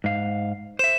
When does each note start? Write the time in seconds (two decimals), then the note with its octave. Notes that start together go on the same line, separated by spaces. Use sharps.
0.04 G#2 F5
0.79 C5 E5 E7